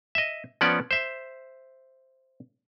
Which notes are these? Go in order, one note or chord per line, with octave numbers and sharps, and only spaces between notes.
D#5 E5
F3 B3 C#4 D5 F#5
C5 E5